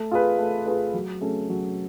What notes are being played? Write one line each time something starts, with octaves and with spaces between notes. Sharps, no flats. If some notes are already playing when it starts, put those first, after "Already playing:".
Already playing: A3
F4 G#4 B4
A3
F4 G#4 B4
F#3
A3 C#4 G#4
F#3